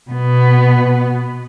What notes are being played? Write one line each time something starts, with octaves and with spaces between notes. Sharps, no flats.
B2 B3